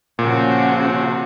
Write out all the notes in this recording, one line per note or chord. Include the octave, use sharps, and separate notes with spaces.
A#2 C#3 F3 F#4